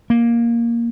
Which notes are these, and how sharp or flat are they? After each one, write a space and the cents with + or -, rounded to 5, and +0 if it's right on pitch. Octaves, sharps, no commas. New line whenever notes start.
A#3 +5